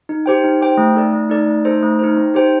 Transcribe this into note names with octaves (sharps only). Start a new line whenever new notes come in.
D#4
G4 C5 G5
D#4
G4 C5 G5
A3
D#4 A4 D5
A3
D#4 A4 D5
A3
D#4 A4 C5
A3
D#4 A4 C5
C4
D#4 G4 C5 G5